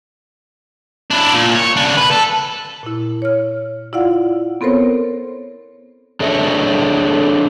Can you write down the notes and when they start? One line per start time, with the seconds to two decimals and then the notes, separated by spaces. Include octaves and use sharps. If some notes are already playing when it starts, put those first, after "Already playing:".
1.11 D4 E4
1.34 A#2
1.55 C#5
1.77 C#3 D4
1.97 B4
2.11 A4
2.83 A#2 E4
3.22 C#5 F6
3.93 E4 F4 D5 F5 F#5
4.61 B3 C4 A4 A#4 C5 C#5
6.20 D4 G#4 A4 C#5 D#5 E5